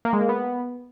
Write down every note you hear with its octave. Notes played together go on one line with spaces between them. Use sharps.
A#3
G#3
A#3
B3